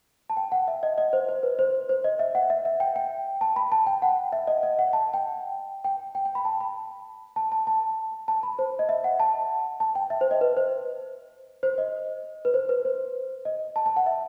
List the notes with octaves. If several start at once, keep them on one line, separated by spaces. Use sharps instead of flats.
A5
G5
F#5
E5
D#5
D#5
C5
C5
B4
C5
C5
D#5
E5
F#5
E5
E5
G5
G5
A5
B5
A5
G5
F#5
E5
D#5
D#5
F#5
A5
G5
G5
G5
G5
B5
A5
B5
A5
A5
A5
A5
B5
C5
D#5
E5
F#5
A5
A5
G5
E5
C5
D#5
B4
C5
C5
D#5
B4
C5
B4
C5
D#5
A5
A5
F#5
E5